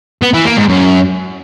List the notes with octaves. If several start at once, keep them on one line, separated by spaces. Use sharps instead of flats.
B3
E3
A#3
G#2
F#2